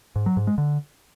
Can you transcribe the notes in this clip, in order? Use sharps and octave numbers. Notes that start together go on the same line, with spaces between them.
G#2
F#3
G#2
G#3
D3